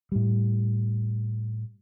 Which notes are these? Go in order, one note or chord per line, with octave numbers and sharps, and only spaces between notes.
A2 G3